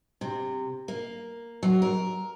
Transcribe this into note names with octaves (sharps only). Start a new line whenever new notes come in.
C3
A#3
F#3
A#4